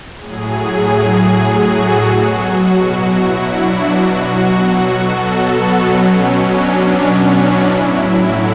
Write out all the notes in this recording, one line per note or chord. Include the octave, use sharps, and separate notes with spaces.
A2 F#3 G#4
G#4
F#4
A4
B2 F#3 F#4
F#4
E4
D4
B2 F#3 F#4
F#4
A4
B3
B2 F#3 C#4
C#4
D4
C#4
D4
E4
A2 F#3